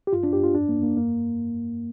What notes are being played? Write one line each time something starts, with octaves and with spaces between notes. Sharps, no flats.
G4
G2 F4
D4
G2 G4
F4
F2 D4
A#3
F2
A#3
G2 A#3